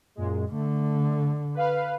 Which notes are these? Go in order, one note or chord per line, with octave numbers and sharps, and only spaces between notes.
F#2 A#2 G#3
D3 A3
B4 F5